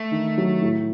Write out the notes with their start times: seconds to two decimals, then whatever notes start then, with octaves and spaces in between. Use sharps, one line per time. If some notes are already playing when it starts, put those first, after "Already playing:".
Already playing: A3
0.11 D#3
0.38 F#3
0.62 A2